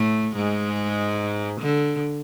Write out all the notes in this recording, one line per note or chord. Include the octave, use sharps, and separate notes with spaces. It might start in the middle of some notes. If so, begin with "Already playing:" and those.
Already playing: A2 A3
G#2 G#3
D3